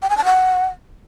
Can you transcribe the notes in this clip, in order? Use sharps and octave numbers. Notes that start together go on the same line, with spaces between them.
G5
G#5
A5
F#5